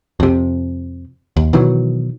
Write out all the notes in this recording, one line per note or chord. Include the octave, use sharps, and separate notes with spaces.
F2 C3
D#2
B2 D#3 E3 F#3